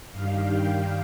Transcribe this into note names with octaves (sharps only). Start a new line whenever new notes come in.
G2 D#3 G3 F5
G5